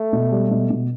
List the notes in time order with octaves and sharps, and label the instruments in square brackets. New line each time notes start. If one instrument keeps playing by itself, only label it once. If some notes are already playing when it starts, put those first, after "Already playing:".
Already playing: [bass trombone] A3
[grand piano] B2
G3
B2
B2